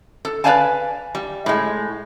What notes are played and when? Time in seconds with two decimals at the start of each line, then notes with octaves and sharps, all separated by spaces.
0.25 A4
0.44 B4 C5 D5 F5 G#5 A5
1.15 G3
1.46 A2 G#3